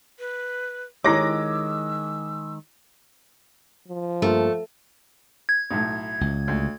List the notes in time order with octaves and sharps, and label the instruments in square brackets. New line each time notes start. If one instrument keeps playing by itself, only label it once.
[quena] B4
[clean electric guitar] D#3 G#3 [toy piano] E4 G4 C#5 [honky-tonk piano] D6 A#6 [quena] E6
[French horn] F3
[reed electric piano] G2 A#3 F4 [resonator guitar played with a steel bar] A3
[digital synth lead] G#6
[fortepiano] B1 A2
[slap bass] C#2
[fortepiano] D2